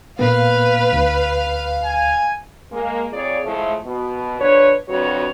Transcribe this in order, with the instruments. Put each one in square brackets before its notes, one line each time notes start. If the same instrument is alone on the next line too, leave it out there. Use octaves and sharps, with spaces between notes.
[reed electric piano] A#2 A#3 B3 [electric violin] B4 [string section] F5
[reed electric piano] D2
[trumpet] G#5
[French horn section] G#3 A#3
F2 F4 G#4 C#5 D5
A2 F3 G#3 A3
B2
D3 F3 B4 C#5
F2 D3 F#3 F#4 B4 C#5